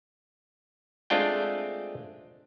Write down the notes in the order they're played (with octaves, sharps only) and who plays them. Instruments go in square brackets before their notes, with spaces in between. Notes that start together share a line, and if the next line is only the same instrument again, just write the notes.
[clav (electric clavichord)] G#3 A3 C4 D4 F4 G5